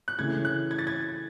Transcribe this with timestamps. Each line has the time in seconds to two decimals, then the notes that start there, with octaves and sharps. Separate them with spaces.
0.08 F#6
0.18 C#3 E3 A3 C#4 E4 G#6
0.45 F#6
0.71 G#6
0.78 A6
0.87 G#6